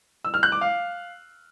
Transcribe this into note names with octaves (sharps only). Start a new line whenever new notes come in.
E6
F6
F#6
D6
F5